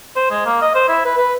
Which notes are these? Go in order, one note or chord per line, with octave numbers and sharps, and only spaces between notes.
C5
G#3
A#3
D#5
C5
E4
B4
B4